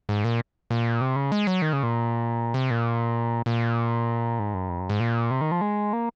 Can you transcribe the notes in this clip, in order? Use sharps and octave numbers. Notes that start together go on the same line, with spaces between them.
G#2
A#2
A#2
C3
C#3
G#3
F#3
D#3
C#3
A#2
C3
A#2
A#2
G#2
F#2
F2
F#2
G#2
A#2
C3
D#3
F3
G#3
A#3